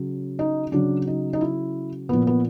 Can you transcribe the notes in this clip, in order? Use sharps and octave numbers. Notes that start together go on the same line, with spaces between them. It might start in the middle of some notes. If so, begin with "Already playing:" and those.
Already playing: C#3 F#3
D#4
C#3 F#3 D4
D#4
D#4
E4
A#2 F3 B3
B3